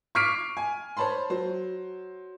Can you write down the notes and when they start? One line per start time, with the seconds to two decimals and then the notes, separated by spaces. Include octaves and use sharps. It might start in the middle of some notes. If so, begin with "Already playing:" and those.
0.15 C#6 D6 F6 B6 C7 D7
0.57 G#5
0.97 C5 C#5 A5 B5 C6
1.30 F#3 C5